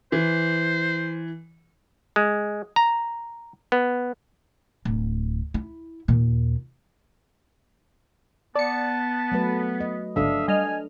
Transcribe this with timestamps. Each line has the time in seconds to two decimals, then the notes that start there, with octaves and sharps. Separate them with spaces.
0.12 E3 C5
2.16 G#3
2.76 A#5
3.72 B3
4.85 D1
5.54 E4
6.08 D#2 A#2
8.55 B3 D5 A5 C#7
9.32 F#3 A3 B4
9.80 D#5
10.16 G1 C#2 F3 D4 A4 E5 F5 D#6
10.48 G3 D#5 G#5 F6